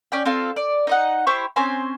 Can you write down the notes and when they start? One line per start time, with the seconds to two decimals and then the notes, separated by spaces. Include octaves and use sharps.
0.12 C#4 D5 G5
0.25 C4 F4 A4 F5
0.56 D5
0.87 D#4 D#5 F#5
1.27 E4 G4 C5 C#6
1.56 C4 C#4 C5 G#5